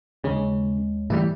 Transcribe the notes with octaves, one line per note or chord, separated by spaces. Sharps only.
D#2 C#3 G#3 C#4
A2 E3 G3 E4